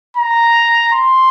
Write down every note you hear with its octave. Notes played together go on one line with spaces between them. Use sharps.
A#5
C6